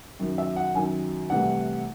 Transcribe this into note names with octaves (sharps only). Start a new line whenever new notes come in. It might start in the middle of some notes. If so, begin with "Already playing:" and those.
F#2 D#3 F#3
E5
F#5
F#2 D#3 F#3 G#5
C2 C3 E3 A3 F#5